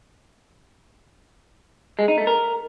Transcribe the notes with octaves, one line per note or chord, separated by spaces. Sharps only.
G#3
D#4
A3
A#4